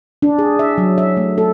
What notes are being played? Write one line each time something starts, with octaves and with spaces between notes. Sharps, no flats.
D4
G#4
E5
F#3
E5
A3
A4